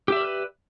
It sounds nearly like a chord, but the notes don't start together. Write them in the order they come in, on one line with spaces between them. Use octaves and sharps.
G4 E5 D5 A#4 B4